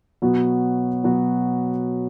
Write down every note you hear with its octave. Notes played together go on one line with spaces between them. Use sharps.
B2 F#3 B3 F#4
B2 F#3 B3 F#4